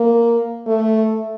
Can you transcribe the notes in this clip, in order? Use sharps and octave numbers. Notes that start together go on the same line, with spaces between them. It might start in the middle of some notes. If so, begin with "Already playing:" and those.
Already playing: A#3
A3